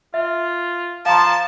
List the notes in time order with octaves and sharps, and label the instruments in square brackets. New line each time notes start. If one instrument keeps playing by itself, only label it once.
[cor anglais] F4 [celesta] E5
[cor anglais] F3 [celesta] F5 A#5 C6 [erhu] A5